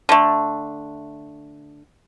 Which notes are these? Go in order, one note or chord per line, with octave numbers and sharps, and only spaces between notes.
D3 A3